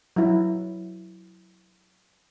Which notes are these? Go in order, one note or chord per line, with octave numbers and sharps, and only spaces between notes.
F#3 E4